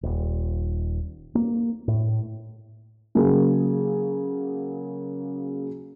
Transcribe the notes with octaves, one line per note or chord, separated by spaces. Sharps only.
D#1
A#3
A2
C#3 F#3 A#3 G#4